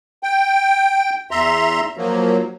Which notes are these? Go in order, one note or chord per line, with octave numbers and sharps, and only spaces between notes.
G5
E2 E5 A#5 C6
F3 F#3 A#3